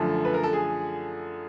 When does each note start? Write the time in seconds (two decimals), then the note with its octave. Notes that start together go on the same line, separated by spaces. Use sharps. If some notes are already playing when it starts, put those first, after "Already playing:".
Already playing: F#2 D3 F3 A3 A4
0.25 B4
0.34 A#4
0.43 A4
0.53 G#4